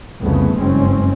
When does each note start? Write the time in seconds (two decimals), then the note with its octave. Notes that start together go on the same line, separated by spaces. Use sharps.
0.21 C2 F2 C#3 A3 B3
0.57 F#1 G2 G#3 C4 C#4